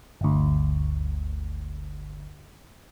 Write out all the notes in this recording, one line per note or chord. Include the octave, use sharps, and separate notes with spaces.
G1 D2